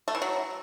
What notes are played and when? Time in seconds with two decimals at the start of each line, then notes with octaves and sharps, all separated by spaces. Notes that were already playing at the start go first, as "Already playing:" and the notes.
0.08 A3
0.15 E3
0.22 F#3